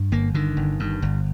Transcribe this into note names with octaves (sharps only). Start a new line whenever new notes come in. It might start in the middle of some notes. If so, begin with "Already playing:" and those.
Already playing: G2
G1 A#3
D3 D#3
G1
G2
G1